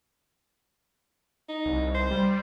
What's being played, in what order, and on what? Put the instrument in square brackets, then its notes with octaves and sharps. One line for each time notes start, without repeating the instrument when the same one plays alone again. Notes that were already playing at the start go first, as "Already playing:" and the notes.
[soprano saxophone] D#4
[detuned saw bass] C2
[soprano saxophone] C5
[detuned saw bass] G3